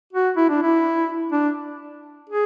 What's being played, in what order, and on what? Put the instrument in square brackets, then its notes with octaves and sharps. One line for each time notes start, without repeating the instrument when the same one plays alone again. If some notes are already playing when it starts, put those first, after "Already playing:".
[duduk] F#4
E4
D4
E4
D4
G#4